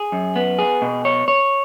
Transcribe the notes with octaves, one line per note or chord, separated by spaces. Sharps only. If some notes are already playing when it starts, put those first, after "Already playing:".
Already playing: G#4
F#2
B3
G#4
B2
C#5
C#5